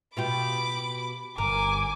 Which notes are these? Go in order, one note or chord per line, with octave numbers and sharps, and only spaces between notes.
B2 F4 G4 B5 D6
G1 A#4 G#5 D6